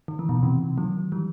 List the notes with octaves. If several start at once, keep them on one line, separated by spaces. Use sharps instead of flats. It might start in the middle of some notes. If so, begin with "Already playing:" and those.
D#3
E3
B2 D#3
C3 E3
D#3 F#3
E3 G3